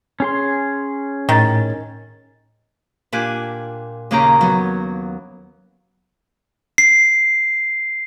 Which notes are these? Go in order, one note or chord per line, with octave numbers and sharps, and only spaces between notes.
C#4 G#4 C6
A2 D#3 A6
A#2 D4 G4 G#5 F#6
D#2 C#3 A#3 C#4 G4 A#5
F#3 B3
C7